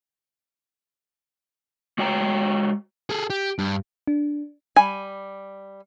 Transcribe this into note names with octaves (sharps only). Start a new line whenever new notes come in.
G#3 F#4 C#5 G5 A5 A#5
G#4 A4
G4
G2
D4
G3 G#5 B5